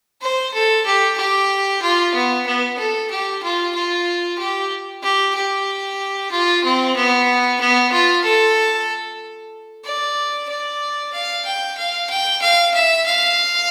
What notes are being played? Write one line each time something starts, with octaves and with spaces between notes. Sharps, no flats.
C5
A4
G4
G4
F4
B3
B3
A4
G4
F4
F4
G4
G4
G4
F4
C4
B3
B3
F4
A4
D5
D5
F5
G5
F5
G5
F5
E5
F5